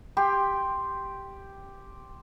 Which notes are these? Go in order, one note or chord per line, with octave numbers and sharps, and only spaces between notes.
G4 G5 C6